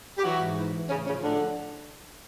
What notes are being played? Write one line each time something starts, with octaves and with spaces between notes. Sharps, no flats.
G4
E3 F#3 F#4
G#2
E3
E3
A2 C#3 C#4
C#3 F3 C#4
A2 D3 D4